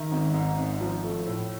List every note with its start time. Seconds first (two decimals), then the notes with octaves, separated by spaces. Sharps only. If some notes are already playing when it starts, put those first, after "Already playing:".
Already playing: D#3 E5
0.11 G#1
0.34 G#2
0.58 G#1
0.81 F3
1.04 A3
1.27 A2